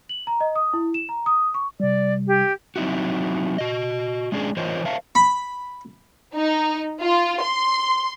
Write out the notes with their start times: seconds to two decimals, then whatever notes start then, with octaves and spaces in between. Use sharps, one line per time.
0.09 F#7
0.27 A#5
0.40 D#5
0.56 D#6
0.73 E4
0.94 E7
1.09 A#5
1.26 D#6
1.54 C#6
1.80 C3 G3 D5
2.27 G4
2.76 F#3 C4 D#4 E4 F#4
3.58 F#4 D#5
4.32 G#3 C#4 D4 G#4
4.57 E3 F4 A#4 C5 C#5 D#5
4.85 A#4 C5 E5 F5 A5
5.15 B5
6.35 D#4
7.02 F4
7.43 C6